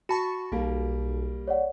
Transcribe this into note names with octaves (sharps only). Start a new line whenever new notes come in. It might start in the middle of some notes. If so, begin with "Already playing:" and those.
F#4 A5 B5 C#6
B1 G3 A#3
C#5 D5 F#5